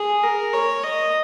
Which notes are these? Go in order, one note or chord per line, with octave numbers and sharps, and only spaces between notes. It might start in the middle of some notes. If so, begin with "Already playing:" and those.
Already playing: G#4
A#4
C#5
D#5